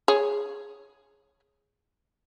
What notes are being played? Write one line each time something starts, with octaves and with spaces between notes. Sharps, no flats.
G#4 C#5